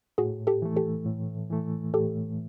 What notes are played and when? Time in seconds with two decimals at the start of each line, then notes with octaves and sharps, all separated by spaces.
0.18 A2 F#4 G#4
0.47 G4 A4
0.62 E3 A3
0.76 G4 A4
1.05 A2
1.50 E3 A3
1.94 A2 G4 A4